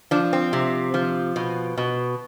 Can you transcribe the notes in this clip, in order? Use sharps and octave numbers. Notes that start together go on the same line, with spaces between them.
F3 D4
C4
C3
F3
B2
B2